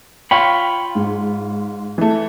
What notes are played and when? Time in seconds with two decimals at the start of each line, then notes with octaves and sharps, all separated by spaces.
0.31 F4 C#5 G5 B5
0.95 G#2
1.98 E3 A3